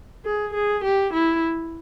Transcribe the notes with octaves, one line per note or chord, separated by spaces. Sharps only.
G#4
G#4
G4
E4